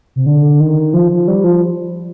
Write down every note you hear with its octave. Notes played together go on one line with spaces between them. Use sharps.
C3
D3
D#3
F3
F3
G3
F3